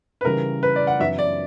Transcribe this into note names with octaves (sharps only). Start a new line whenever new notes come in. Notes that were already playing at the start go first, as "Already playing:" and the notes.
B4
C#3 E3 G3 A#4
B4
D5
F#5
F#2 E3 B3 E5
D5